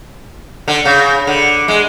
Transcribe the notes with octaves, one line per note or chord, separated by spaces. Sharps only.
D3
C#3
D3
G#3